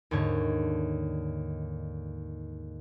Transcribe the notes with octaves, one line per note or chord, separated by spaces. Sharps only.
D#2 G#2 D3 C#5